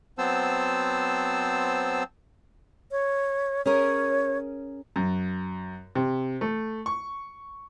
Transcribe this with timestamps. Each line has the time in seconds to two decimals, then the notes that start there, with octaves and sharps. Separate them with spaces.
0.18 F#3 B3 C4 C5 A5 E6
2.91 C#5
3.66 C#4 G#4 A#4 C#5
4.96 F#2
5.95 C3
6.41 A3
6.86 C#6